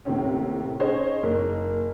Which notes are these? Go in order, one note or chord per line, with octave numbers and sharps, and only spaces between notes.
D#2 A2 C3 C4 C#4
C#4 D#4 G#4 C5 C#5 D#5
F#1 A#3